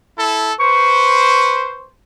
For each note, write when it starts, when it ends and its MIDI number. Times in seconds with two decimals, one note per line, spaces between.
0.18 0.53 64
0.18 0.53 69
0.60 1.90 71
0.60 1.90 72
0.60 1.84 85